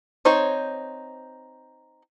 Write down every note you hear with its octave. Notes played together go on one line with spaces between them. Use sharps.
C4 D#4 C5 C#5